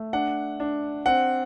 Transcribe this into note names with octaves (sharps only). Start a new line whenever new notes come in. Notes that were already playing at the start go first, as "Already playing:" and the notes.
Already playing: A3
D4 F#5
D4
C4 F#5